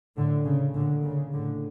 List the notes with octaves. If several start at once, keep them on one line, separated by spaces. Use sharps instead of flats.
A2 D3
C#3
A#2 D3
C#3
A2 D3